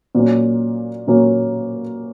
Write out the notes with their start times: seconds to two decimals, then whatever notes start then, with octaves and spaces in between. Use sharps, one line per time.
0.15 A#2 F#3 A#3 C#4
1.07 A#2 F#3 A#3 C#4